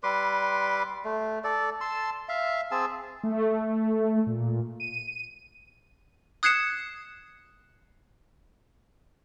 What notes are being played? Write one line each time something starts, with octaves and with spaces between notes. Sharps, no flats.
G3 B4 C6 D6
A3
A4 D5
A5 C6 E6
E5 F5
C4 G#4 A5 E6
A3
A#2
D#7
D#6 F#6 G#6 C7 C#7 E7